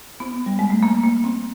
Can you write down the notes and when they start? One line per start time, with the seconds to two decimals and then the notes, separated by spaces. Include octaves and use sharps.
0.20 B3
0.46 G3
0.59 G#3
0.70 A3
0.83 A#3
1.04 A#3
1.24 C4